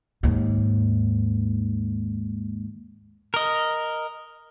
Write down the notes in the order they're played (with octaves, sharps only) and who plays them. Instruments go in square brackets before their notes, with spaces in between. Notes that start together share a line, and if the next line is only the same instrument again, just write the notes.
[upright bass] D#2 G#2
[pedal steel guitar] A#4 D#5